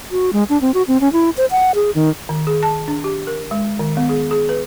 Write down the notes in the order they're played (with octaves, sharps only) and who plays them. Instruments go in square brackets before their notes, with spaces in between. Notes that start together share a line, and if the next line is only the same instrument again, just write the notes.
[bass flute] F#4
G#3
D4
C4
F#4
C4
C#4
E4
C5
F#5
G#4
D#3
[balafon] D#3
G#4
A5
D4
G4
A#4
G#3
D#3
B3
G#4
G#4
B4